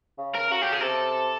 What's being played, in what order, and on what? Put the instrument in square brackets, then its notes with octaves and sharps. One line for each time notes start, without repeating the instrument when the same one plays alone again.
[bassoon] C#3
[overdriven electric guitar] A#4
[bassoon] C#3 [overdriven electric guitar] F#4
[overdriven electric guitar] G4
G#4
[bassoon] C3 [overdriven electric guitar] A4